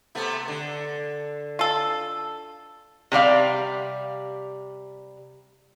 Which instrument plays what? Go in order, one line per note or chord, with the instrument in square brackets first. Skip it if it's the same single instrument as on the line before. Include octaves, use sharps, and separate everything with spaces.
[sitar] C3 A3 B3
D3
[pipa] F4 A4
[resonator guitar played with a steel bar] C3 G3 D5 F5